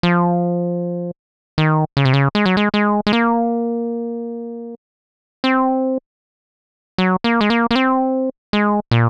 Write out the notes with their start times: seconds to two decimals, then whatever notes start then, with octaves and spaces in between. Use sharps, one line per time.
0.03 F3
1.58 D#3
1.97 C#3
2.05 C3
2.13 C#3
2.35 G#3
2.46 F#3
2.57 G#3
2.74 G#3
3.07 G#3
3.13 A#3
5.44 C4
6.98 F#3
7.24 A#3
7.41 G#3
7.50 A#3
7.71 A#3
7.76 C4
8.53 G#3
8.91 A#2